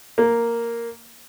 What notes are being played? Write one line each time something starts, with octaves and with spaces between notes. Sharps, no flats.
A#3